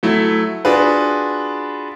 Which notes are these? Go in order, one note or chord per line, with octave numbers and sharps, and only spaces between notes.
F#3 A3 E4
D4 F4 F#4 G#4 B4